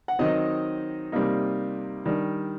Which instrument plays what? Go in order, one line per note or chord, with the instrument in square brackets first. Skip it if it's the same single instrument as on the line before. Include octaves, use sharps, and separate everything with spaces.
[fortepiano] F#5
D#3 F#3 C4 D#4 D#5
C3 G3 A#3 D#4
D#3 G3 D4